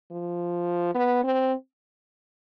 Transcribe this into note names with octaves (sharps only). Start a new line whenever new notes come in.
F3
B3
C4